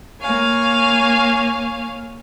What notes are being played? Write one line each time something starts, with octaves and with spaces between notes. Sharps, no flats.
A#3 C#5 F5 G#5